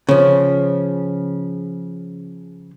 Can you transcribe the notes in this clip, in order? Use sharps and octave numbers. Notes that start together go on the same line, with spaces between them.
C#3 F3